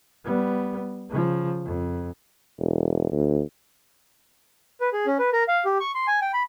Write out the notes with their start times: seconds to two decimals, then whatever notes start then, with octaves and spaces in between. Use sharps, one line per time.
0.25 G3 B3
1.09 C#3 F3
1.65 F2
2.59 E1
3.12 D2
4.81 B4
4.93 G#4
5.06 C#4
5.19 B4
5.33 A#4
5.48 F5
5.65 G4
5.80 C#6
5.95 C6
6.08 G#5
6.22 G5
6.34 B5